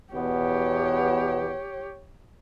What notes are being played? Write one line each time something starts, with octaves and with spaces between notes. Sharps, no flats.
E2 B2 B3 G4 C#5